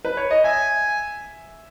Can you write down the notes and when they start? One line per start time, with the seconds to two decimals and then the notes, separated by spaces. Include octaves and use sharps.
0.05 B4
0.17 C#5
0.31 D#5
0.44 E5 G#5